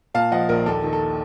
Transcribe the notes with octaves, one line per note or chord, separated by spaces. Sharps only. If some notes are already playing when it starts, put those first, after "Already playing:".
A#2 F5 A5
F3 D#5 F#5
A#1 A#4
D#2 A4
D#3
A4